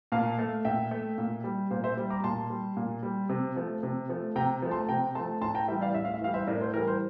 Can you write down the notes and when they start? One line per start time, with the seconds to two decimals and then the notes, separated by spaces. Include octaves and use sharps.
0.12 A#2 F5 A5
0.39 A3
0.65 A#2 E5 G5
0.91 A3
1.18 A#2
1.44 G3
1.70 A#2 C5
1.84 C5 E5
1.97 G3
2.10 A#5 D6
2.23 A#2 A5 C6
2.50 G3
2.77 A#2
3.03 G3
3.29 C3
3.56 F3 A3
3.83 C3
4.09 F3 A3
4.36 C3 G5 A#5
4.62 F3 A3
4.71 A5 C6
4.89 C3 G5 A#5
5.15 F3 A3 A5 C6
5.41 A2 A5 C6
5.55 G5 A#5
5.68 E3 G3 E5 G5
5.81 D5 F5
5.94 A2 E5
6.05 F5
6.14 E5
6.21 E3 G3 F5
6.34 C5 E5
6.47 A2 A#4 D5
6.61 C5
6.74 E3 G3 A#4
6.87 C5